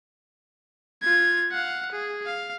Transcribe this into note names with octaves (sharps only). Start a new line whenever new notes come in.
F4 G#6
F5 F#5
G#4
F5